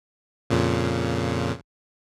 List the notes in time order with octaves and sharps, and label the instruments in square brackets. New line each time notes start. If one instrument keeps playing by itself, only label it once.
[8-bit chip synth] F2 A#2 C#3